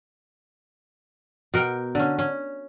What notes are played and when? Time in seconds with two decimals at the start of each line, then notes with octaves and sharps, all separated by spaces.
1.54 B2 A#4 F#5 G5
1.95 D3 C#4
2.19 C#4